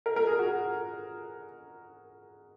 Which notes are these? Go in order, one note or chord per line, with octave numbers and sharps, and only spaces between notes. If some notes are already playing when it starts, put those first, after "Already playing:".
A#4
A#4
G#4
F#4